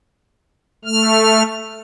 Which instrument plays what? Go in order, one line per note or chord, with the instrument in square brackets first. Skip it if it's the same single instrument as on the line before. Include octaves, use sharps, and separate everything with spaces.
[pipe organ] A3 F6